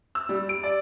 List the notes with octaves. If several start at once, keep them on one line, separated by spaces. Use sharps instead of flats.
E6
G3
D7
D5